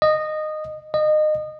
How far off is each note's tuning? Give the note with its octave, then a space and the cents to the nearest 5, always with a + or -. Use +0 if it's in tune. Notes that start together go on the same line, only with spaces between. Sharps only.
D#5 -15
D#5 -25